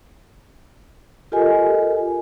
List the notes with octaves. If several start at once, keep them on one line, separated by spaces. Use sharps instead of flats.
F4 G4 A4 A#4 D#5 G#5